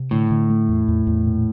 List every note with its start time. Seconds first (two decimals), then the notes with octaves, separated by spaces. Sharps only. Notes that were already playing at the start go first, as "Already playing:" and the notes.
Already playing: C3
0.11 A2 D3
0.31 D3
0.50 A3
0.69 E2
0.88 E2
1.07 E2
1.27 A#2